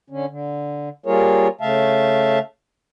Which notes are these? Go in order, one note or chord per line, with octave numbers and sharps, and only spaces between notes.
D3 C#4
D3
G3 A#3 F4 G#4 A#4 C#5
C#3 A3 E5 F5 A5